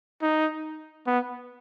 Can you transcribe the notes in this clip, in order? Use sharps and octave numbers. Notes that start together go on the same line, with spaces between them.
D#4
B3